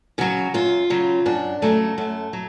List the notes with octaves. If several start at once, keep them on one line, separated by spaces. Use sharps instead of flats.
C#3 F#3 F#4
F#2 F4
C#3 F#3
F#2 D4
C#3 F#3 A3
F#2 A3
F#3